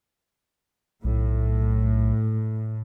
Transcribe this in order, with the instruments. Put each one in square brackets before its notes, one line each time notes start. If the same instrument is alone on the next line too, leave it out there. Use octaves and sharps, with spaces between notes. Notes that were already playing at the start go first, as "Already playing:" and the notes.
[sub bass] B1 [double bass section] A2